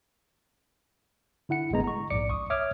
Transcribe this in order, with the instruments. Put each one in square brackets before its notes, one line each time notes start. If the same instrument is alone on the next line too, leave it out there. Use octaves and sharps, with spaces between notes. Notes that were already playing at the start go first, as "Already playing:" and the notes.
[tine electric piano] D3 E4 F#5 C#7
G1 G#2 D3 G#3 B3 A#5
A#5 C#6
A#1 G#2 D5 D6 C#7
C#2 C#6 D#6
C#5 E5 D6 D#6 F6 G#6